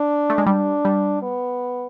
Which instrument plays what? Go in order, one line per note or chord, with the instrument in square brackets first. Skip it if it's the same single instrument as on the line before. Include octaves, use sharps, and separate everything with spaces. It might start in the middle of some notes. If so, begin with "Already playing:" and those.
Already playing: [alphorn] D4
[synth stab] A3
G#3
[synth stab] G3 [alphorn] D4
[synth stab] G3
[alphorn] B3